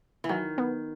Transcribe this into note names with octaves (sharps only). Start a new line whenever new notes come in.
E3
D#3 F#3
B3